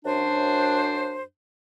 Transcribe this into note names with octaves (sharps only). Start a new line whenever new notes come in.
F#2 D4 C5